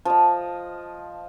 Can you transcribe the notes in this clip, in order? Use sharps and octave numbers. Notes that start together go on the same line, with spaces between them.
F3 D#5